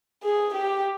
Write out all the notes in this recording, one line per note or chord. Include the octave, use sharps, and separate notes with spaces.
G#4
G4